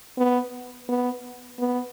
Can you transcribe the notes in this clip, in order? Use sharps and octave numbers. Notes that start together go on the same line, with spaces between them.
B3
B3
B3